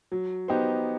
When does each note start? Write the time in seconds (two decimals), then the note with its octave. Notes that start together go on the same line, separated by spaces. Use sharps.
0.12 F#3
0.48 B3 D#4 G4 C5